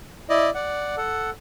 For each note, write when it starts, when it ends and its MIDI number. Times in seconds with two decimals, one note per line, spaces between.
0.30 0.50 64
0.30 0.50 74
0.30 0.50 75
0.55 0.96 74
0.55 0.96 78
0.97 1.30 69
0.97 1.30 78